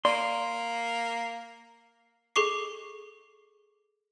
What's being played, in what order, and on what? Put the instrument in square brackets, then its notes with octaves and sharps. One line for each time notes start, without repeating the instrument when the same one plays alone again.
[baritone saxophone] A#3 [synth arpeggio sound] D5 D7 [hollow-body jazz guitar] C6
[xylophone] G#4 A4 C#6 D6 C7